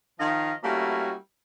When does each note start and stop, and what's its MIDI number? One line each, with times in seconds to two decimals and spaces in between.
0.19 0.53 51
0.19 0.53 53
0.19 0.53 75
0.19 0.53 77
0.64 1.13 55
0.64 1.13 57
0.64 1.13 58
0.64 1.13 61
0.64 1.13 64
0.64 1.13 66